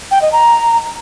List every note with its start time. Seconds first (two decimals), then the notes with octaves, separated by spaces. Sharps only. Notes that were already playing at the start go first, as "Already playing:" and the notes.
0.11 G5
0.22 D#5
0.32 A#5